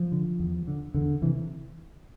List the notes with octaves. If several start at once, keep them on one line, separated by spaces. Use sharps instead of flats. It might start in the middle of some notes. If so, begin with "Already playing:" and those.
Already playing: F3
D3
E2
D3
E2 D3
C3 E3